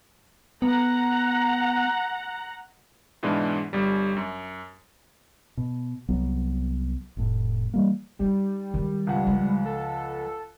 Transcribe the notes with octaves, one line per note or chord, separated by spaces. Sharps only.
B3 F#5 A#5
G#2 B2 E3 G#3 D4
G1 G3
F#2
B2
C2 F#3 B3
F1 A2
E3 G3 A#3
G3 D#4
D#3
C#2 F#5
F3 G#3
A4